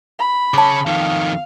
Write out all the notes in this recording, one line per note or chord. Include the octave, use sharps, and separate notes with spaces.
B5
C#3 C#5 A5 D6
F2 D#3 F5